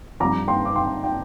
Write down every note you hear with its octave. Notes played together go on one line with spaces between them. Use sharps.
G2 F3 A#5 D6
G5 C6
D6
G5 C6
G5 C6